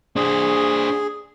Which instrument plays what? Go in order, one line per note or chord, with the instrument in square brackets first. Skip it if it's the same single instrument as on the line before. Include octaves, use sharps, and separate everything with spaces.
[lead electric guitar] D4 C5 [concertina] G#4